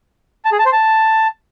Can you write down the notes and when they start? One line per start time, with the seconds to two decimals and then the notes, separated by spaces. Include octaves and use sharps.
0.45 A5
0.52 G#4
0.59 A5
0.66 C5
0.73 A5